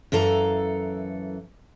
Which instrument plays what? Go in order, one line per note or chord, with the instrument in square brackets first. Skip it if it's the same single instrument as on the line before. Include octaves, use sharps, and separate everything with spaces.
[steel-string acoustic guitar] F#2 E3 A4 F5 A#5